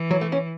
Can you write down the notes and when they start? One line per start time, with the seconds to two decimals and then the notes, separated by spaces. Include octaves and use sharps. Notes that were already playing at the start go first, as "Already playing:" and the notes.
Already playing: E3
0.11 F#3
0.21 A3
0.32 C#4